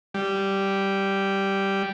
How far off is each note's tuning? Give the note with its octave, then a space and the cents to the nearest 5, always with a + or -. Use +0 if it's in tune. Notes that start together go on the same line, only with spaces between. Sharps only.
G3 -5